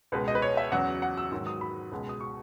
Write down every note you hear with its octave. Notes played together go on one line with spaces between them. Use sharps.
C#2 B2 G#3 B4
D#5
B4
C#5
E5
E2 C#3 F#3 F#5
F#5
E6
G#2 D#3 F#3 E6
D#6
B5
C#2 B2 G#3
D#6
C#6